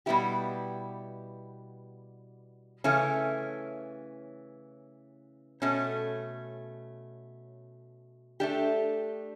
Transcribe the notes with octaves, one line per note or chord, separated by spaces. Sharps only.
B2 G3 B3 E4 G4
C#3 E3 A3 C#4
B2 A3 C#4
A3 D4 G4